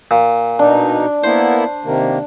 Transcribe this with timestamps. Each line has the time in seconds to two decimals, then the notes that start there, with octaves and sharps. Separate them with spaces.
0.11 A#2
0.59 B2 D4 D#4
1.24 A#3 B3 E4 C5
1.84 C3 D#3 A#3